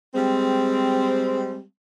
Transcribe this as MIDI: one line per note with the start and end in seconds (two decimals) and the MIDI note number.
0.15 1.61 55
0.15 1.61 56
0.15 1.61 60